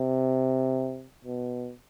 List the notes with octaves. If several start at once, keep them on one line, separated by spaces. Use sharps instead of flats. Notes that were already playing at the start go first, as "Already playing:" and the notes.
Already playing: C3
B2